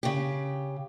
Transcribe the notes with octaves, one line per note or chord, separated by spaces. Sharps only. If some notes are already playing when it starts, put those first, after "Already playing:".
C#3 G4